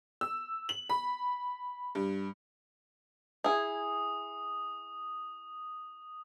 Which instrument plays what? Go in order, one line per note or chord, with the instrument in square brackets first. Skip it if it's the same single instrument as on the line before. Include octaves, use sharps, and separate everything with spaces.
[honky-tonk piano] E6
F#7
B5
G2
[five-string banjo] E4 G#4 [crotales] D#6